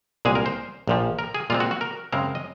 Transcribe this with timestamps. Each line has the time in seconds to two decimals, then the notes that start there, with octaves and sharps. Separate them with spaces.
0.25 C2 A#2 G#3 G#4
0.35 A#4
0.46 C5
0.88 A#1 A#2 F3
1.19 A#4
1.35 G#4
1.50 A#2 G#3 C4 F4
1.60 F#4
1.71 F#4
1.81 A#4
2.12 F#2 C#3 G#3 C4 A#4
2.35 D#5